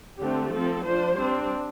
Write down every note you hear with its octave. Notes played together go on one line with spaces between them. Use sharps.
D3 A3 C4 G4
F3 C4 A4
F3 D4 C5
G3 C4 D4